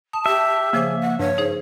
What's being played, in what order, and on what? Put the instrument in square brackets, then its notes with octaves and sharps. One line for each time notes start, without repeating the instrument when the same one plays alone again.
[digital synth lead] A5 [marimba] D#6
[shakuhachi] G4 [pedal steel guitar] E5
[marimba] C#3 F3 C5 [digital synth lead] A#3 [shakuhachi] G#4
[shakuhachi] F#5
[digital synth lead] G2 [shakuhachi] C#5
[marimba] D#4 G#4 C5